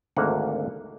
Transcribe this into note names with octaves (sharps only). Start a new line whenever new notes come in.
G#1 D2 A#3 F#5